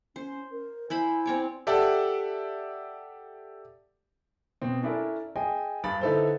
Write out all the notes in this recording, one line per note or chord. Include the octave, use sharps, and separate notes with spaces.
C#4 C5
A#4
E4 C5 G#5 B5
C4 C#5 D5
G4 A4 D5 E5 F#5 A5
B2 C4
C#4 D4 E4 A4 A#4
G#4 D#5 G5 G#5
G2 B5 A6
D3 D#4 E4 A4 B4 C5